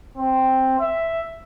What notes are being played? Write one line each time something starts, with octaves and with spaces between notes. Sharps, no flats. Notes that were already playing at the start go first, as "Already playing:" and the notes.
C4
E5